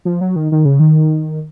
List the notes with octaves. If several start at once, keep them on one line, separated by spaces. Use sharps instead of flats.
F3
F#3
D#3
D#3
C#3
D#3